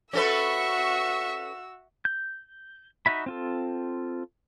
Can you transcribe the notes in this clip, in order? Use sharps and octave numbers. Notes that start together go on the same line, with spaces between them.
C#4 F#4 A4 B4 E5 C#6 E6
G6
D#4 F#4 E5 B5
C4 F4 A4